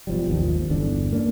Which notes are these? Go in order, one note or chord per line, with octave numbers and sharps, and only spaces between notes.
B1 F3 G3
G#1 D#2 D#3 F3
G1 E2 D3 D4
A#3 D4